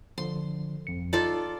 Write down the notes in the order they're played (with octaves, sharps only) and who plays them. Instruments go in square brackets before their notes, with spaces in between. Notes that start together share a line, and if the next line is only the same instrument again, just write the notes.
[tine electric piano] D3 F3 [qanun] C6
[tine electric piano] G1 F2 C#7
[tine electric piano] D#4 [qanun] F4 A4 D5